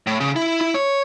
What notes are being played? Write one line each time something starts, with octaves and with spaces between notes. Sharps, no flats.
A2
C#3
E4
E4
C#5